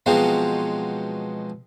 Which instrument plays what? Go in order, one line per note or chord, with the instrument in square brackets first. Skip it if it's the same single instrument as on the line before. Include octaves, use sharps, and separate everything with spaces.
[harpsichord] B2 F3 F#3 G#3 C4